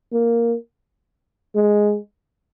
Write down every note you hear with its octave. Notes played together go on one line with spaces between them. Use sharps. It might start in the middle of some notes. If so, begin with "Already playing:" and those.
A#3
G#3